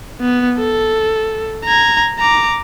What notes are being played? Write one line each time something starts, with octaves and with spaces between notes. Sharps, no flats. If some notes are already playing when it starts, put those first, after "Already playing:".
B3
A4
A#5 G#6
A#5 D6